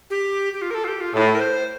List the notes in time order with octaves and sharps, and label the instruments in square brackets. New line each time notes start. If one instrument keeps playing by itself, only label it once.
[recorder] G4
G4
F4
A#4
A4
F4
G4
F4
[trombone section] A2 [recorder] A4
[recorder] A#4
C5